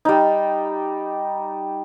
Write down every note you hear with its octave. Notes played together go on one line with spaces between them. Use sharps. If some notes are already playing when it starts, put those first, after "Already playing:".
G3 D#4